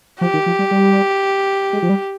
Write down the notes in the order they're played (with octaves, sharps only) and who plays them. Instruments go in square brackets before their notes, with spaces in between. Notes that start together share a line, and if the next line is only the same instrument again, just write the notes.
[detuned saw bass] F3 [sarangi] G4
[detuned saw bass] D#3
F3
G3
G3
G#3
F3
G3